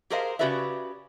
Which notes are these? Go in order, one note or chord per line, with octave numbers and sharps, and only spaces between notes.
G4 G#4 A#4 C5 D#5 F5
C#3 F#4 G4 B4 D5 E5